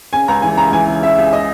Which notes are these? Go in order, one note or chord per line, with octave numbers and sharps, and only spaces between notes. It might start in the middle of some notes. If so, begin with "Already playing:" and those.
C#3 G#5
C#2 A#5
E3 G#5
C#2 A#5
E3 G#5
C#3
C#2 E5
C#2
D#5